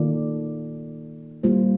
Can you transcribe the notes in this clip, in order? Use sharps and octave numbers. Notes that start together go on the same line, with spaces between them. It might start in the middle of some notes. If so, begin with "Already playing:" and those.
Already playing: D#3 A#3 F4 A4 D5
G3 A#3 F4 C5